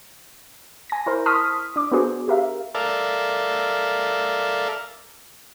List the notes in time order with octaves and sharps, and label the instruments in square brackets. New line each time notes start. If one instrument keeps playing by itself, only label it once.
[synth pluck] G#5 A#6
E4 A#4 C5
A5 C6 C#6 D#6 F6 B6
D4 D6
B3 D4 F#4 G#4 C5
G4 A#4 E5 F5
[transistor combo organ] A4 A#4 D5 E5 F5